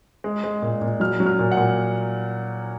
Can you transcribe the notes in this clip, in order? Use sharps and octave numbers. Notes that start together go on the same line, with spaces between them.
G#3
G#3
A#2
A#2
F#3 F6
F#3
F6
A#2
F#5
A#2